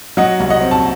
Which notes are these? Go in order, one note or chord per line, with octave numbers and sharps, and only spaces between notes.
F#3 D#5 F#5
C2
D#5 F#5
C4
A5